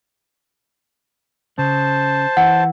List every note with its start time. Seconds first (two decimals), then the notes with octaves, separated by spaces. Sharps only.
1.58 C#3 C5 A5
2.37 E3 F#5